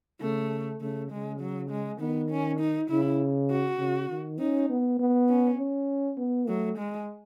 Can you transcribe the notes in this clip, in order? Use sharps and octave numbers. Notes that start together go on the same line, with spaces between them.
C#3 A3
C#3 A3
C#3 G#3
F#3
G#3
D#3 B3
C#4
D#4
C#3 E4
F#4
C#3
D#3
C#4 D#4
B3
B3
C#4
C#4
B3
F#3 A3
G#3